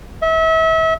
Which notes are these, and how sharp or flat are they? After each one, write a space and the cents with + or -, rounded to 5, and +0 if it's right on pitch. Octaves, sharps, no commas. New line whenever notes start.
E5 -35